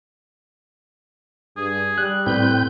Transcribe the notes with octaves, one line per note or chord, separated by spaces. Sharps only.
G2 G#4
G3 F#6
A2 C4 B4 G6